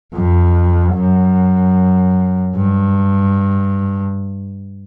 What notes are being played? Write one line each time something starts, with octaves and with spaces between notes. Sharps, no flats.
F2
F#2
G2